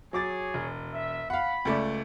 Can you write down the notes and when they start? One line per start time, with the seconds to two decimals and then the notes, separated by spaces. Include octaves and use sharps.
0.13 F#3 G#4 C#5 D6 A6
0.54 E1
0.94 E5
1.30 F5 F#5 B5
1.65 C#2 A3 D5